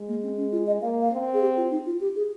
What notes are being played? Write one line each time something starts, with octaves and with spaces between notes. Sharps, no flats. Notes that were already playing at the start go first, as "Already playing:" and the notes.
Already playing: G#3
A#3
C4
C#4
F4
D#5
A#3 F5
F5
C4
G#4
G4
F4
D#4
F4
G4
G#4